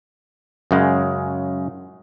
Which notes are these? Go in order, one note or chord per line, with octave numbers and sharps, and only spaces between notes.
F#2 C#3 G#3